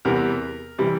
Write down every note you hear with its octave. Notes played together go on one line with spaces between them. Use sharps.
E2 C3 E3 G3 A#4
C3 E3 G3